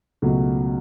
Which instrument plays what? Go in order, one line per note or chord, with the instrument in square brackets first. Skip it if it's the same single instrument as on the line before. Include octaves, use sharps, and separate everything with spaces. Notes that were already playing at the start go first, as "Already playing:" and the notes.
[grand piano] C#2 B2 F#3 A3